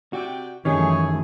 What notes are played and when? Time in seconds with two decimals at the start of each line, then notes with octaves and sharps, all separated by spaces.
0.13 C3 F#4 D5 G5
0.65 F#2 D#3 E3 A3 C#4 G4 G#4 C#5